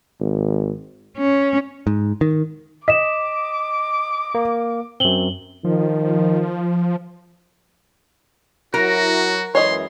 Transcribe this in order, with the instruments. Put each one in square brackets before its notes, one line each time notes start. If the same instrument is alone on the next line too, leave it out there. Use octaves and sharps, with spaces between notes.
[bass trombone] G#1
[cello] C#4
[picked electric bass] G#2
D#3
[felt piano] D#5 [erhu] D6 [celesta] B6 E7
[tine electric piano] A#3
[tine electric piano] F#2 C4 [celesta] F#7 G7
[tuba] D#3 [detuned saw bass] F3
[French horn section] F#3 E4 [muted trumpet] F#4 [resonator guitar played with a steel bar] A#4
[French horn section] F#2 E3 G#3 [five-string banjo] C#5 D#5 [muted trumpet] C6